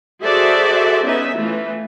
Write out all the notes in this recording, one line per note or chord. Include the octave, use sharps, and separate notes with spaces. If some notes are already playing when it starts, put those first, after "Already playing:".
F#4 G#4 A4 C5 D5 E5
B3 C#4 D#4 E5
E3 A3 F4